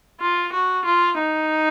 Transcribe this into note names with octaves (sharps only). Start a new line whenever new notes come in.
F4
F#4
F4
D#4